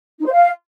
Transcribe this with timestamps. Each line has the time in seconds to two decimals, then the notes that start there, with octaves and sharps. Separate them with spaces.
0.20 D#4
0.26 C5
0.32 F5